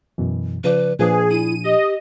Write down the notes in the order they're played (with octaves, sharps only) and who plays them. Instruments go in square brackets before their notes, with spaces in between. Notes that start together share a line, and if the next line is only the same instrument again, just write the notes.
[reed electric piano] F#2 B2 E3
[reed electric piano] C#3 F3 D5 [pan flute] B4
[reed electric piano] A#2 F3 D4 [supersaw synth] G#4 [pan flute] B4
[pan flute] E4 [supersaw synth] D#7
[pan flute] G4 [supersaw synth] D#5